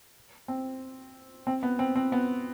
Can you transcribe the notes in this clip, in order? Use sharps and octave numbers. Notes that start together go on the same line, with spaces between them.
C4
C4
B3
C4
C4
B3